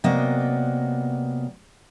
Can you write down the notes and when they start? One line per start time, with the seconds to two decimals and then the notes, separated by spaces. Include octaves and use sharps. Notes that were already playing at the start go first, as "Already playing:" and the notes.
0.04 C3 F#3 A#3 B3 D5 D#5